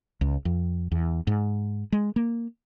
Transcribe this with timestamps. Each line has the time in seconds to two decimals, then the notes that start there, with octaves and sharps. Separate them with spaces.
0.21 C#2
0.45 F2
0.92 E2
1.27 G#2
1.92 G#3
2.16 A#3